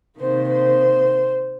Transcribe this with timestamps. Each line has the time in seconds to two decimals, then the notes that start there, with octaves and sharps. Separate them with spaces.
0.20 C3 D#3 A#3 C5
0.49 C5